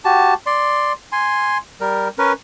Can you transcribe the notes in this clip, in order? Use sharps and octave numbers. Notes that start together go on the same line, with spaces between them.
F#4 G4 A5
D5 C6
G#5 C6
G3 A#4
C#4 A#4 B4